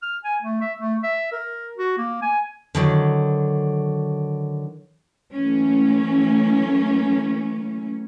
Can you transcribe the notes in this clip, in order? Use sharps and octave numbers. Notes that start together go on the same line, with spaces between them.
F6
G#5
A3
E5
A3
E5
A#4
F#4
A#3
G#5
D3 D#3 F#3
E3 F#3 A3 A#3 C#4